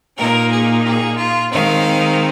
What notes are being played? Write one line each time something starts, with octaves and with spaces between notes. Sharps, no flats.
A#2 A#3 D#4 A#4
G#4
G#4
F4
D#3 G#3 C4 D#4 F5